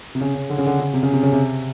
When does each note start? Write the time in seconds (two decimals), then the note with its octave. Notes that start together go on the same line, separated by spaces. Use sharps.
0.15 C3
0.21 C#3
0.35 C#3
0.50 D3
0.58 C#3
0.67 D3
0.79 C#3
0.93 C3
1.03 C#3
1.13 C3
1.23 C#3
1.32 C3